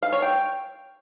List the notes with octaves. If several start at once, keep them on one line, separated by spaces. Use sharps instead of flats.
F5
C#5
G5